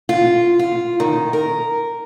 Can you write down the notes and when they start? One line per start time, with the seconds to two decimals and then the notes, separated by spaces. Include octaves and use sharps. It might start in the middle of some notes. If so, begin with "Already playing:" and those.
0.09 F4
0.59 F4
1.00 D#3
1.33 A#4